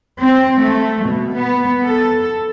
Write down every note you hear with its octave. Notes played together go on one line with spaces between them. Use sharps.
C4
A3
B2
B3
A4